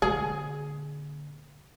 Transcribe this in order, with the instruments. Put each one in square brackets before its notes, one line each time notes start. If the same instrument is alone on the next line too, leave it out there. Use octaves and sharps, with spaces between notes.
[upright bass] A#2 D3 [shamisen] G#4